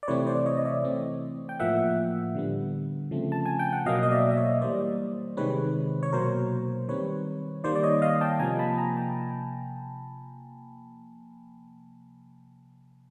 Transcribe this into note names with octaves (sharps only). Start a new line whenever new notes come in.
D5
C3 E3 A3 C4 B4 C#5
C5 D5
C#5 D#5
D#5
D5 E5
E3 A3 C4
G5
A2 F3 A#3 E5 F#5
D3 G3 B3
C#3 F3 A3 C4
A5
G#5
G5
F#5
B2 F#3 A#3 D#5 F5
D#5
D5 E5
E5
C#5 D#5
E3 G3 A#3 C5 D5
C3 D#3 G#3 C4 B4 C#5
C#5
B2 F#3 A#3 A#4 C5
D#3 G3 C4 B4 C#5
D#3 G3 A#3 C5 D5
D5
C#5 D#5
D#5 F5
G5 A5
C3 F3 A#3 G#5 A#5
A5 B5
G#5 A#5
G5 A5